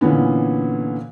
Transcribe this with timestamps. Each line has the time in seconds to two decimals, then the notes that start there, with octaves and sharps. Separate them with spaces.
0.01 A#2 D3 E3 B3 C#4